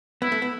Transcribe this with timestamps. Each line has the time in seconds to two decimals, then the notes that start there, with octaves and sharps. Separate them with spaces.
0.22 B3 E4
0.32 A3
0.42 B3